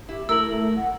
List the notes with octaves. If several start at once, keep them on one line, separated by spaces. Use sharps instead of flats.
E4 G4
A3 E4 A#4 E6 F#7
F#5